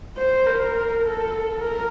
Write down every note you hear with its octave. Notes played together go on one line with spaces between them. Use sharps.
C5
A#4
A4
A#4